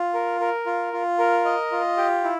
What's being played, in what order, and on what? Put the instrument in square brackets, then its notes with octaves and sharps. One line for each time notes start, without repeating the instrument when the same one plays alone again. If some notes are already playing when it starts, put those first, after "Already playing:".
Already playing: [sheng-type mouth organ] F4
A#4
A#4
F4
F4
A#4
D#5
F4
G4
E4